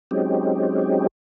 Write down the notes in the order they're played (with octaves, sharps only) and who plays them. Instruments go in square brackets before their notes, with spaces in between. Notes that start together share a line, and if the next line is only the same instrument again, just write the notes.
[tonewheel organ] F#3 G#3 C4 C#4 D#4 G4